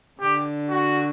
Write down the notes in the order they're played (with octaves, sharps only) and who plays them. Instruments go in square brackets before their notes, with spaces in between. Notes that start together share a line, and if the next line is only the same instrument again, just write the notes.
[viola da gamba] D3 [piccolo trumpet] G4
[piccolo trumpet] F#4